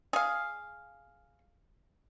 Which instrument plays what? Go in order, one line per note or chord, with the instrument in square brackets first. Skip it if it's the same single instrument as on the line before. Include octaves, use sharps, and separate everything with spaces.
[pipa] G#4 F5